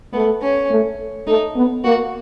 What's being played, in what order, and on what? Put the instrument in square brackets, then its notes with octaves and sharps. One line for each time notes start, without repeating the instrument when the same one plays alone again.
[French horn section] A3 [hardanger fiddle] B3
[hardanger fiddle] C#4
[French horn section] A3
[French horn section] A3 [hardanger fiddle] D#4
[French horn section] B3
[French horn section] A#3 [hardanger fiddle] F#4